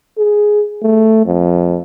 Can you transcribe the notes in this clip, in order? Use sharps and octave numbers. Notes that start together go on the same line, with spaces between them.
G#4
A3
F2